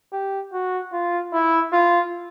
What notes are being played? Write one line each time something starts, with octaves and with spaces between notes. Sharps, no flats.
G4
F#4
F4
E4
F4